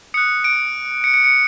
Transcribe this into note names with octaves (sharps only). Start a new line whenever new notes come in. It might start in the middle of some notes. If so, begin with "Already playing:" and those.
D#6 F#6 C#7
D7
C#7
C#7
C#7